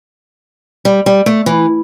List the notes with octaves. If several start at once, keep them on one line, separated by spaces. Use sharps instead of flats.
G3
G3
A3
E3